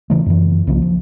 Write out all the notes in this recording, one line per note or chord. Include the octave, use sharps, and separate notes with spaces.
C#3 E3 A3
F#2 E3
C2 C#3 F3 A#3
F3